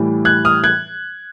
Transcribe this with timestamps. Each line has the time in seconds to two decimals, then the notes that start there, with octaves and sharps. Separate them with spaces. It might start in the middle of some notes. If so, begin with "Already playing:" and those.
Already playing: A2 E3 G3
0.25 F#6 G#6
0.45 D#6 F6
0.64 F#6 G#6